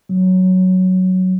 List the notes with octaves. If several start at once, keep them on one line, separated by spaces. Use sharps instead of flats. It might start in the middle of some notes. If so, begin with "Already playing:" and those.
F#3